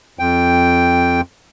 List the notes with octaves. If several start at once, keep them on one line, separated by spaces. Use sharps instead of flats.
F2 G5